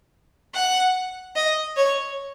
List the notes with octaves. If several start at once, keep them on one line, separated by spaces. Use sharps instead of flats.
F#5
D#5
C#5